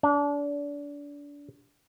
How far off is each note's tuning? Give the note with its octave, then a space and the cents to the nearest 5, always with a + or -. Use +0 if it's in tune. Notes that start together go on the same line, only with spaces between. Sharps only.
D4 -30